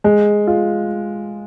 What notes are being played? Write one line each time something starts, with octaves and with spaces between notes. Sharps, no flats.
G#3
F4